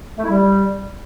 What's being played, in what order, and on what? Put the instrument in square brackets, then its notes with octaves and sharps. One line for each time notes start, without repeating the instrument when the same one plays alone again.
[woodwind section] A3
E4
G3